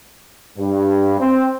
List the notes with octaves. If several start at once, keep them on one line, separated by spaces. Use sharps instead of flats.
G2
C4